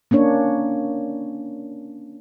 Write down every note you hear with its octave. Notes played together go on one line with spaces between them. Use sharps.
A#3 C#4 D4 C#5